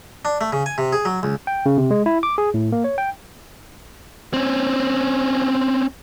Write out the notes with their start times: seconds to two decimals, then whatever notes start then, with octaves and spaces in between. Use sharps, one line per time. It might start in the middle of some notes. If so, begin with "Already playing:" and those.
0.25 D4
0.41 A3
0.53 C#3
0.66 G#5
0.78 C3
0.93 G#4
1.05 F#3
1.23 C#2
1.47 G5
1.66 C#3
1.78 C3
1.91 G#3
2.06 E4
2.23 D6
2.38 G#4
2.54 A2
2.72 A#3
2.84 C#5
2.98 G5
4.34 C4 C#4